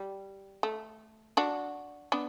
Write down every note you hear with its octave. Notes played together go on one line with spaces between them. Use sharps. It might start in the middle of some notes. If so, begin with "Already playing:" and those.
Already playing: G3
A3
D4 F#4
B3 D4